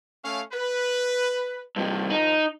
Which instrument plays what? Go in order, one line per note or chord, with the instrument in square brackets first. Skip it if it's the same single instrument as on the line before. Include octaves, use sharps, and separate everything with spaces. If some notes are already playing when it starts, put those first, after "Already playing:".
[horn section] A3 C#4 F5
B4
[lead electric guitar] G2 C3 [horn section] D#3 F3
[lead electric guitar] D#4